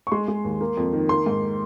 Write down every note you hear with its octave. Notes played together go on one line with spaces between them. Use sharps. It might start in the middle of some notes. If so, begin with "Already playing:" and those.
C#6
G#3 C6
G#3
D#2
A#3
F2
D#3
A#3 C6
G#2